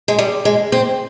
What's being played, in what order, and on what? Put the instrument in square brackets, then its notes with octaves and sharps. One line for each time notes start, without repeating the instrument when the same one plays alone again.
[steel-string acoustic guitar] G#3
G3
G#3
C4